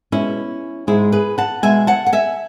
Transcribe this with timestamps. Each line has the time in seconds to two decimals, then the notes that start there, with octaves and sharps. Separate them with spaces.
0.12 B2 G#3 C#4 E4
0.87 G#2 G#3 E4 G#4
1.12 G#4 B4
1.38 F#5 A5
1.62 B2 G#3 E5 G#5
1.87 F#5 A5
2.06 F#5
2.13 E5 G#5